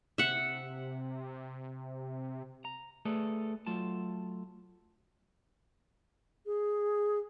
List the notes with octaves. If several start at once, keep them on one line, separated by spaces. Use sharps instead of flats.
C3 E5 F#5
A#5
A3 G#4 A4 B4 D5
F#3 A3 F4 A5
G#4